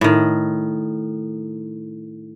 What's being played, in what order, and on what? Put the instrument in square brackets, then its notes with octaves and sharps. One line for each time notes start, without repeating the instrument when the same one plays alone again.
[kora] A2 D#3